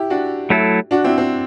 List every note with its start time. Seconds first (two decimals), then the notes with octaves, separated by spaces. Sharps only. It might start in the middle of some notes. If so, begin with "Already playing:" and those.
Already playing: E4 G4
0.10 D4 F#4
0.50 F#3 A3 E4 A4
0.91 D4 F#4
1.04 C4 E4
1.18 C4